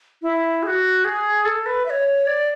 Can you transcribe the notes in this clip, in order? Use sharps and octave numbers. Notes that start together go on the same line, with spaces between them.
E4
G#4
F#4
G#4
A4
B4
E5
C#5
D5